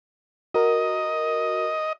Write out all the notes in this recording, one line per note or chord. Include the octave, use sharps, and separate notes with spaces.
F#4 A#4 D#5